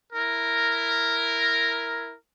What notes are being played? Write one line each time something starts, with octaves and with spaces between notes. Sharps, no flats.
E4 A#4